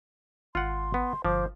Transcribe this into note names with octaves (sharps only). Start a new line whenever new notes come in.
G#1 F4 F#5 C6
B3
G1 F3 C5 D6